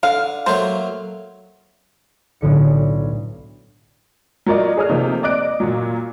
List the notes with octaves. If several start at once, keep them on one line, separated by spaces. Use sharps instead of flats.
D3 F5
F#3 A3 A#3 C5
B1 A2 D3 C#7
F#3 F4 A#4 D5 D#5
G#4 A4 C#5 D5 D#6 F6
C3 F3 A3 A#3 D#4
D5 D#5 D6 F#6 D7
A#2 F#3